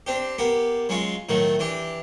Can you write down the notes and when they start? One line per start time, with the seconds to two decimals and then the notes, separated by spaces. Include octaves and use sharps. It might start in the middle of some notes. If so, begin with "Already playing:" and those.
0.07 C4 D4 G4
0.38 A#3 B3 G4
0.89 F#3 G#3 C#4 F4
1.29 A2 D#3 F#3 A3
1.59 E3 D4 G4